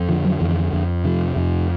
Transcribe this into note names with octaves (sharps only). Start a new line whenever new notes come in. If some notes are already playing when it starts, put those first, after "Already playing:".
Already playing: F2
D3 F3
F#3
F2 E3
F2
C3 F3
F2